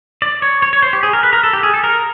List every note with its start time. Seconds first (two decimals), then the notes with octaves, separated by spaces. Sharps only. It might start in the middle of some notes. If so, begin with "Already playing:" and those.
0.22 D5
0.42 C#5
0.62 C#5
0.73 C#5
0.82 C5
0.93 G4
1.03 G#4
1.13 A#4
1.23 B4
1.33 A#4
1.43 A4
1.53 G4
1.63 G#4
1.74 A4
1.84 A#4